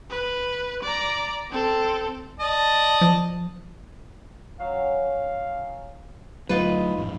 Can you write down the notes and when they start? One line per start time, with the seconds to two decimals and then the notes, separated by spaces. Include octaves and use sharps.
0.11 B4
0.83 D5 A#5
1.51 C4 A4
2.39 D5 D#5 A5
3.01 F3
4.59 F#3 C#4 F5
6.49 D2 F#3 A3 D#4 F4 B4
6.97 A1 F2 G#2